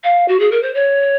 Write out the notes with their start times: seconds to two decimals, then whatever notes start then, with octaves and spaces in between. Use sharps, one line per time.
0.04 F5
0.28 F#4
0.40 G#4
0.52 A#4
0.63 C5
0.75 C#5